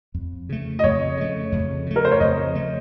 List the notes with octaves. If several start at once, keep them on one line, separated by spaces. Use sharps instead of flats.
F2
C#3 A3
D#5
F2 C#5
C#3 A3
F2
C#3 A3
A#4
C5
C#5
F2 D#5
C#3 A3